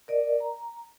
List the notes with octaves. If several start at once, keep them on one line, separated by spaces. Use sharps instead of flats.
A#4 D5 D#5
A#5